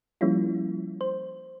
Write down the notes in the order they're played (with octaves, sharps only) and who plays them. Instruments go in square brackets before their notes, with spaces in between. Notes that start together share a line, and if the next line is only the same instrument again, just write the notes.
[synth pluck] F3 G3 A#3 C#4 E4 F4
C5